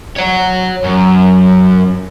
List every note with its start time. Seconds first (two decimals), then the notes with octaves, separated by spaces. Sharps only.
0.17 C#5 F#5
0.84 F#2